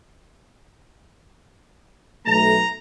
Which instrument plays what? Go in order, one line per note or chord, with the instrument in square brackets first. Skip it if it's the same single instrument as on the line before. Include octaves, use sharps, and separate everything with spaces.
[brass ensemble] B1 A3 [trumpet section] A#5